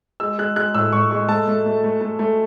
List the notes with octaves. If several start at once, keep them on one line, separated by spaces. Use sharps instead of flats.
G#3 E6
G#3 F#6
G#3 F#6
A2 E6
A2 C#6
G#3 C#6
A3 A5
A3
A3
A3
A3
A3